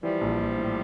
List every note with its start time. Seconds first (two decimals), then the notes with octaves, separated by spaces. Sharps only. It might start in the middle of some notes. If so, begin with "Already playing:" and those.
0.03 E3 F3 G3
0.21 A#1
0.40 A#1
0.59 A2